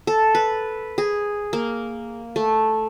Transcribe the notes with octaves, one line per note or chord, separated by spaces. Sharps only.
A4
B4
G#4
A#3
A3